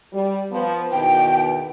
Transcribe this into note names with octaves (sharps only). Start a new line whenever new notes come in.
G3
F3 B3
E2 B2 D#3 G5